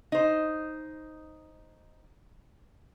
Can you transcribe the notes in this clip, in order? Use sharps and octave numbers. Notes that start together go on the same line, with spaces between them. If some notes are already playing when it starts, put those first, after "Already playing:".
D#4 C5